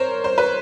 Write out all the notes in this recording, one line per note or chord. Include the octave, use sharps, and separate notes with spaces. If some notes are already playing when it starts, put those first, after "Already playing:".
Already playing: A#4 C5 C#5
C5
B4